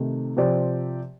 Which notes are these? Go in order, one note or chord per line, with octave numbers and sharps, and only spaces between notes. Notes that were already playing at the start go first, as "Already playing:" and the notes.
Already playing: C3 D#3 A3 D#4
C3 F3 C4 G4 D5